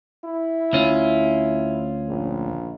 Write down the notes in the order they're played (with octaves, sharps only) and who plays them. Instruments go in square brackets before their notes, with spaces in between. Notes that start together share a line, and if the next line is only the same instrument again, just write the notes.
[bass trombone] E4
[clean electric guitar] D2 C#4 F4
[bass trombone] A#1